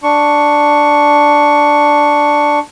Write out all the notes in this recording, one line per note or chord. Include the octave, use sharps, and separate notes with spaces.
D4 C#6